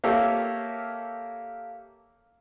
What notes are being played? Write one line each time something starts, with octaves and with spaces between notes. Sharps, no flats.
A#3 G4 A4 C#5 E5 F5